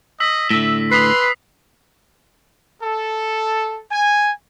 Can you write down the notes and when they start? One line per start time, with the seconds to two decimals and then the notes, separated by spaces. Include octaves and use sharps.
0.20 D#5 E6 B6
0.50 A2 D3 E5
0.91 B4 C6 D#6 B6 C7
2.82 A4
3.90 G#5